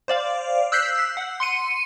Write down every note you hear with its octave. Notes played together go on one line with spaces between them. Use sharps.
C5 D5 F5
E6 F#6 G6 B6 C7
F#5
C6 C#7 D#7